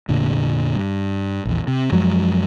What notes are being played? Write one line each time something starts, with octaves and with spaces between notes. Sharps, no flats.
F1 A#2 D3
G2
A#1 E2
C3
F#2 F3 F#3 G#3